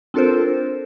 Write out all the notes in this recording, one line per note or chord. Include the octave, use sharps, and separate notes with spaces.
C4 D4 F4 A4 A#4 C5